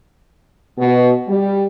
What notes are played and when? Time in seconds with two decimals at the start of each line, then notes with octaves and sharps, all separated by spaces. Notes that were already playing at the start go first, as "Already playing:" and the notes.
0.78 B2
1.28 G3